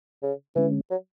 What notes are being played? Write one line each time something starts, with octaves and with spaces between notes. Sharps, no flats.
C#3
D3 E3 G#3 C#4
F#3